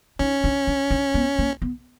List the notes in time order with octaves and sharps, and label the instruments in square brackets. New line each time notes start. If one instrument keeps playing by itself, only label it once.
[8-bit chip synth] C#4 [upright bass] D#4
[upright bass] D4
D4
D4
B3
A#3
B3